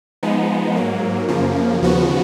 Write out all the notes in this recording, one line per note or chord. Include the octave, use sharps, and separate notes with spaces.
F3 G#3 B3 D#4
G#2 F#3 A#3
F#2 C#3 F3 A#3
D#2 C#3 F3 B3 F#4